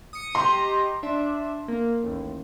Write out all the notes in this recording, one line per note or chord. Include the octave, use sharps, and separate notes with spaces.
D#6 C#7
G4 D#5 A#5 C6
D4 E5
A#3
A1 D#2